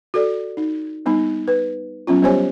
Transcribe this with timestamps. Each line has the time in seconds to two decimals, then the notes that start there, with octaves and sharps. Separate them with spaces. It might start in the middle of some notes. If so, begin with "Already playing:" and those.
0.14 F#4 A4 D5
0.57 D#4
1.06 G3 B3 D#4
1.48 B4
2.07 F#3 B3 C#4 F4
2.22 G3 B3 G4 C5 C#5 G#5